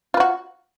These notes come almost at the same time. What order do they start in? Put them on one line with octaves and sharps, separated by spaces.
F4 B4 F#4